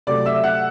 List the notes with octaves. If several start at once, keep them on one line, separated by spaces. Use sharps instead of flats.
C3 F#3 A3 D5 D6
E5 E6
F#5 F#6